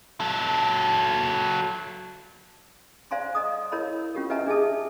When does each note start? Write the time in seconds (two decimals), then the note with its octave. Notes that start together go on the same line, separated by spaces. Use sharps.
0.20 F#3 A4
3.11 C5 D5 F5 G#5 A#5 C6
3.35 D5 D#5 A#5 D#6
3.72 E4 A#4 C#5 D#5 A#5 B5
4.15 C#4 F4 G4 A#4
4.30 B4 D#5 E5 G#5 A#5
4.47 D4 G#4 D#5 E5 A5 D#6